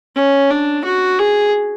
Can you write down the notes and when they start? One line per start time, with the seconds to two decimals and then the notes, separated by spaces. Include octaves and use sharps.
0.16 C#4
0.50 D4
0.85 F#4
1.19 G#4